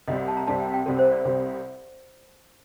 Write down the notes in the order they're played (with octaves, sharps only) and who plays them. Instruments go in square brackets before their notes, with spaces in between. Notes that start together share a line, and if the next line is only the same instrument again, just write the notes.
[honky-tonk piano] C2 C3 G3 C4 [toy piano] D#5
[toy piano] F#5
A5
A#5
[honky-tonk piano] C2 C3 G3 C4 [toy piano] A5
[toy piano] G5
G5
[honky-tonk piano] C2 C3 G3 C4 [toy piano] A4
[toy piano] C5
D5
[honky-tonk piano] C2 C3 G3 C4